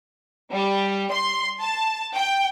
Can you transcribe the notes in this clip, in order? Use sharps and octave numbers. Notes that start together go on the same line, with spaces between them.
G3
C6
A5
G5